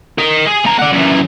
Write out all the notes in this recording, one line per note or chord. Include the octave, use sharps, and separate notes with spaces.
A#4 D#5
G#4
A3 A#5
D5 F#5
F#2 E3